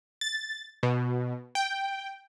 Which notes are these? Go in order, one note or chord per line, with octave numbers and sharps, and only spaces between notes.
A6
B2
G5